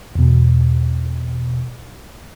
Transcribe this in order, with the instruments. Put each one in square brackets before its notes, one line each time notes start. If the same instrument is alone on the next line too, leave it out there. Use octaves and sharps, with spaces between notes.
[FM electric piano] E2 B2